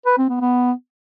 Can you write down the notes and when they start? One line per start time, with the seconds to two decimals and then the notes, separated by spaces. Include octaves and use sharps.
0.06 B4
0.18 C4
0.29 B3
0.41 B3